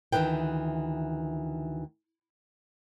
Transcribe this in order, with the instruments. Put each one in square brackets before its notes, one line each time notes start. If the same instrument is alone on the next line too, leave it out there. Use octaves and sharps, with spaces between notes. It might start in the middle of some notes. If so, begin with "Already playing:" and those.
[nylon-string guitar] D2 D#3 E3 B4 G5